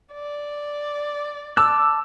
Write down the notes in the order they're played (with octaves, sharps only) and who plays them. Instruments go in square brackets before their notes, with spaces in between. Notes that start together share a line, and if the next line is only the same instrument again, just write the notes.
[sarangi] D5
[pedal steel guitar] A5 D6 F#6 [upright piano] E6